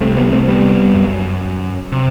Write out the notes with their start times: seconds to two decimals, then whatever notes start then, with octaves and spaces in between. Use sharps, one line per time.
0.01 C2 C3 A3 C4
0.16 G3 B3
0.32 A3 C4
0.48 G3 B3
0.94 F#2
1.92 C3